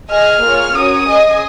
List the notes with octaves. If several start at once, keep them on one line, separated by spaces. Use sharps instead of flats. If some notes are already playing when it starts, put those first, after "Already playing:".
G#4 D#5 G#5 F6
A#3 F4 G#4 C#5
C#4 F#4 A#4 C#5 D#6
G#4 D#5 G#5